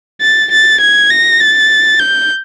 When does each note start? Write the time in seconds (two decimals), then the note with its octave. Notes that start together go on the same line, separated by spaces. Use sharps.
0.21 A6
0.51 A6
0.81 G#6
1.11 A#6
1.41 A6
1.99 G6